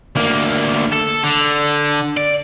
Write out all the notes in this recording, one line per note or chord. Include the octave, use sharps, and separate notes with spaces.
D2 A#3
A4
D3
D5